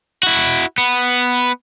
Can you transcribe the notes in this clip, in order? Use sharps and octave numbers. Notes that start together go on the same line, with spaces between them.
E4 F#4
B3